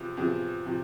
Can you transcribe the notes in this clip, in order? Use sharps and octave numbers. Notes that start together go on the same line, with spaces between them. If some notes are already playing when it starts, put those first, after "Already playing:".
Already playing: E2 C3 F3
E2 C3 F3
C3 F3